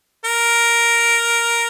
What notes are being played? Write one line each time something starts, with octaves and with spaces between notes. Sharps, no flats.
A#4